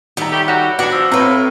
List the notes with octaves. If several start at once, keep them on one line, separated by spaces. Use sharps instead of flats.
D#3 G3 B3 E5 A#5
A3 G4
F#3 F#4 G4 F#5
B2 D4 F#4 F#5 B5
F3 E6
A2 C4 B4 C5 F5 A#5